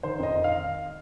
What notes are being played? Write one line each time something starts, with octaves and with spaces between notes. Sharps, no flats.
D#3 C5
F2 D#5
D#3
F5